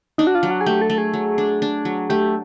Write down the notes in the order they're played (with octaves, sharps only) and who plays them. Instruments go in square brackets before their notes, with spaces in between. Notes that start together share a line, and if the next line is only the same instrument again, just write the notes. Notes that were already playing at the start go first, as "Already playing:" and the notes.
[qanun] D4 [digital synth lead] D#4
[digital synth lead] F#4
F4
[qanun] F#3
[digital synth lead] F#4
G#4
[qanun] A3 [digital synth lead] G4
[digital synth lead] A4
[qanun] A3
[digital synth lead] G#4
[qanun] F#3
D4
D4
F#3
[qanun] A3 [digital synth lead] G4